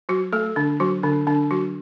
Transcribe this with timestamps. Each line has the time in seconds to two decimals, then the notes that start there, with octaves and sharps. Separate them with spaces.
0.09 F#3 F#4
0.33 A3 A4
0.56 D3 D4
0.80 F#3 F#4
1.03 D3 D4
1.27 D3 D4
1.51 F#3 F#4